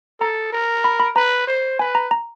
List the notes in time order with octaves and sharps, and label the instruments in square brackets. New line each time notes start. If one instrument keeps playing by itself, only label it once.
[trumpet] A4 [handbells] A#5
[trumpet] A#4
[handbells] B5
B5
[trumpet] B4 [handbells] A#5
[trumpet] C5
[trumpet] B4 [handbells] G#5
[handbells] A#5
A#5